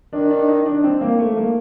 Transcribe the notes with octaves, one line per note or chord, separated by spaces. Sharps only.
D#3 D4
D4
D#4
D4
C4
A#3
A3
A#3